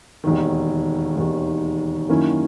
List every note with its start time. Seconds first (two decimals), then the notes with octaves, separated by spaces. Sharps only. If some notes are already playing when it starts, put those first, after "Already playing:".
0.24 E1 D#2 D#3
1.16 E1 D#2 D#3
2.09 F#2 D#3 A#3 C#4 E4